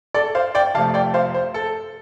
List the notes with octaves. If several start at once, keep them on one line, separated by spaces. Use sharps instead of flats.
A4 D5
C5 F5
D5 G5
F2 C3 F3 A3 F5 A5
D5 G5
C5 F5
C5
A4